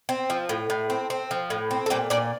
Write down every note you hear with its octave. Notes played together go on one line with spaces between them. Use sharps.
C4
F3
A2
A2
C4
C4
F3
A2
C4
A4
A#2 G3 G4
A#2 D4 D5